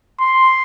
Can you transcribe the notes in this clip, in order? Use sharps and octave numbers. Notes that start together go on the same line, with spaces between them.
C6